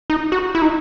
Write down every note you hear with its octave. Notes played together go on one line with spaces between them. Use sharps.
D#4
F#4
E4
D#4